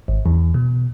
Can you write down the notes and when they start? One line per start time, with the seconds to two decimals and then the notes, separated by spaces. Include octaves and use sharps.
0.08 G#1
0.26 E2
0.54 B2